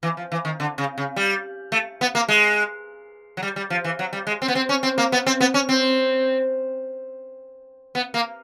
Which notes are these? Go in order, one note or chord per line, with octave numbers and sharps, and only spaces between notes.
E3
F3
E3
D#3
D3
C#3
C#3
G3
A3
B3
A#3
G#3
F#3
G3
G3
F3
E3
F#3
G3
G#3
C4
B3
C4
C#4
C4
A#3
B3
C4
B3
C#4
C4
B3
A#3